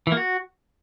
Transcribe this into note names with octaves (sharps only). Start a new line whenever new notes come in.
E3
A#3
F#4